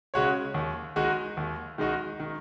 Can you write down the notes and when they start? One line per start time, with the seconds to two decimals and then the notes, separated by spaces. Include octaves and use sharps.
0.14 C#3 G#3 F#4 C#5
0.54 D#2
0.96 D#3 G#3 D#4 F#4
1.37 D#2
1.78 D#3 G#3 D#4 F#4
2.20 D#3